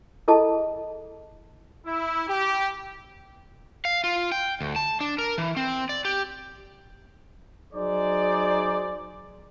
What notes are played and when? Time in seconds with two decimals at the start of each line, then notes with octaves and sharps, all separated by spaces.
0.28 E4 G#4 A4 D#5 A5
1.86 E4
2.28 G4
3.85 F5
4.04 F4
4.32 G5
4.61 D2
4.76 A5
5.00 D4
5.18 A#4
5.38 E3
5.57 C4
5.89 D5
6.05 G4
7.73 F#3 D#4 G#4 C5 D5